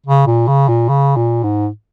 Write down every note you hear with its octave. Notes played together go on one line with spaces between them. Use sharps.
C#3
A#2
C#3
A#2
C#3
A#2
G#2